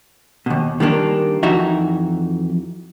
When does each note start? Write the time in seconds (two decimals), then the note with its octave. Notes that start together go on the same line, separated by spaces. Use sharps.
0.46 D#2 B2
0.80 D#3 G3 A#3 D4
1.43 F2 E3 D#4 F#4 E5